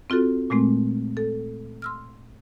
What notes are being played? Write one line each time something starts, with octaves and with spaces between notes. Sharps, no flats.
C4 F4 F#4 A4
A#2 G#3 A3 C4
A4
C6 E6 F6